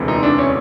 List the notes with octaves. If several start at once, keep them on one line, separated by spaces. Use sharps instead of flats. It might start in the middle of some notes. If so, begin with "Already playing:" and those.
Already playing: E1 D2 C3 E3
D#4
D4
C#4